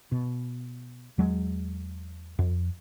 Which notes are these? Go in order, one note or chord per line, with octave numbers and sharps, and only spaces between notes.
B2
E2 F#3 G#3
F2